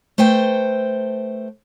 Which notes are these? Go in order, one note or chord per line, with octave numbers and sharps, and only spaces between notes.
A3 B4 C5 G5